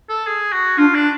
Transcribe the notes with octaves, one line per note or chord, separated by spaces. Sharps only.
A4
G#4
F#4
D4 F4
D4